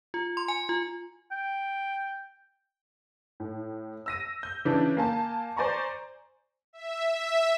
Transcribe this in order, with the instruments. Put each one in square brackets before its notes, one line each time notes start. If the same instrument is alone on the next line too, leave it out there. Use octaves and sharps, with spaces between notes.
[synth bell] F4
C6
G#5
F4
[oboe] G5
[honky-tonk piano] A2
E6 A#6 D#7
G6
C#3 E3 C#4 D4
A#3 G#5 A5
C5 D5 G#5 A#5 C#6
[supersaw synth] E5
E5